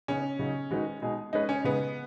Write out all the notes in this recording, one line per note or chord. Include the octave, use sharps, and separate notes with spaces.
C#3 B3 C#4 D#4
C#3 F#3 D#4 F#4
D#3 G#3 D#4 F#4 B4
B2 G#3 D#4 G#4
G#3 C#4 D#4 B4 D#5
C#4
C#3 G#3 B3 D#4